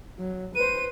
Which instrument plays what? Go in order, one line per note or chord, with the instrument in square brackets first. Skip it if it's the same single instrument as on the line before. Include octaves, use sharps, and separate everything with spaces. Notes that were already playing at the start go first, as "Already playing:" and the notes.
[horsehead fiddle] F#3
[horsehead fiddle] B4 C5 [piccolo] D#7